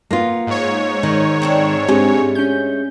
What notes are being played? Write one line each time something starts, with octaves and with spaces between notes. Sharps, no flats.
A#3 B3 F4
G#2 C#5
D#3 D#5
C4 D4 A4
G#3 A3 C4 D4 G4 G#5
C#4 G6